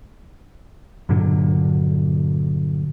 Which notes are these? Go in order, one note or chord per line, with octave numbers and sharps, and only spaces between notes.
G2 A#2 D3 F#3